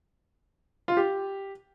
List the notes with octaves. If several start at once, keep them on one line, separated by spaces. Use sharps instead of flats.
F4
G4